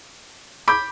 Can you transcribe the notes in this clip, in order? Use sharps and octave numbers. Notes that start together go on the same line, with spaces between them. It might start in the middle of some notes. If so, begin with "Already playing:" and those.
B5 D6 G6